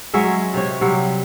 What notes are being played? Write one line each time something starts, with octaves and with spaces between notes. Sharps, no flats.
F#3 G#3 C#4 E5
C3 C#5
C3 F#3 G3